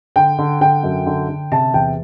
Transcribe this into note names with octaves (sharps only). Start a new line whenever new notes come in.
D3 G5
D3
D3 G5
F#2
D3
D3
C3 A5
E2 G5